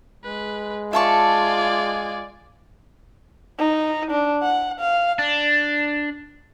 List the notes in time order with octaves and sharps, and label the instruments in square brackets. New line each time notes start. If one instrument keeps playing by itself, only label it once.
[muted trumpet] G#3 [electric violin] B4
[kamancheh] F4 [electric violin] D5 G#5 [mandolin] E5 A5 C#6
[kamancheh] D#4
D4
F#5
F5
[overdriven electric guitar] D4